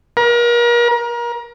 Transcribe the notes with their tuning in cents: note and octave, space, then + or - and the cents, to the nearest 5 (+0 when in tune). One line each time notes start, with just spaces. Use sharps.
A#4 +35
A#4 +30